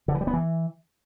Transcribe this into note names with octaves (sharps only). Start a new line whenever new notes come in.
D3
E3
G3
B3
E3